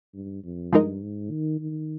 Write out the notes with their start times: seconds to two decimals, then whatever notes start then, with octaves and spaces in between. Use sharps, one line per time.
0.14 G2
0.44 F2
0.73 G2 F3 G#3 D#4 A#4 D#5
1.02 G#2
1.30 D#3
1.60 D#3